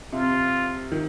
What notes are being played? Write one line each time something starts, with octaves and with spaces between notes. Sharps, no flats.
C3 F4
D#3